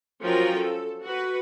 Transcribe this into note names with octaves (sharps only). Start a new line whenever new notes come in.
F3 F#3 C#4 F4 A#4 G5
A4
F#4 B4